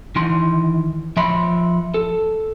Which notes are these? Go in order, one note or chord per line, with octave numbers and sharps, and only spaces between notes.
D#3 E3 C6
F3 E5 B5 C6
A4